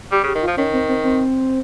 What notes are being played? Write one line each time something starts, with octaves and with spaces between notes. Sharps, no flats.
G3 G4
C#3 G4
D#3
F4
F3
D#3 C#4
C4
C4
C4